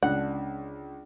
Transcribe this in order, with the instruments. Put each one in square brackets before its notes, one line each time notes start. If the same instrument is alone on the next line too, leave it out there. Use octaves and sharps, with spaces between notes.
[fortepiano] C#2 [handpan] D4 [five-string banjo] F#5